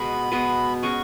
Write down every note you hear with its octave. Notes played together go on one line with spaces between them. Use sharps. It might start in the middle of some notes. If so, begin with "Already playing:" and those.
Already playing: B2 G#3 B3 F#4 B5
B2 G#3 B3 F#4
G#3 C#4 F#4 C#6